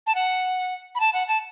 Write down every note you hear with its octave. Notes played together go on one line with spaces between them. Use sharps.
A5
F#5
B5
A5
F#5
A5